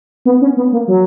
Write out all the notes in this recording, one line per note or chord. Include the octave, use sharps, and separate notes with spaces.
B3
C#4
B3
A#3
F#3